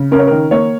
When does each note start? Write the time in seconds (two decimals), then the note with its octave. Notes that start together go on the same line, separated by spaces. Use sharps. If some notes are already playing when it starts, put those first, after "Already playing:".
Already playing: C#3
0.11 C#4 A#4
0.19 C#5
0.27 D#3 A#4
0.51 A#3 C#5